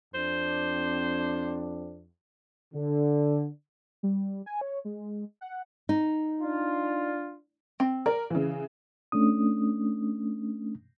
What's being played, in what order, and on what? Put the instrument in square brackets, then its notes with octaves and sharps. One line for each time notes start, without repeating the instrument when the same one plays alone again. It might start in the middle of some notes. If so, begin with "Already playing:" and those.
[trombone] F2 [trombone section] C4 D4 [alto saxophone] C5
[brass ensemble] D3
[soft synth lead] G3
G#5
C#5
G#3
F#5
[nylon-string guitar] D#4
[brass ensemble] D4 F4
[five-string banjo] C4
[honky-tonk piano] A#4 [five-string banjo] D5
[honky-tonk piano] C#3 E3
[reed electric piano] A3 C#4 D4 D#6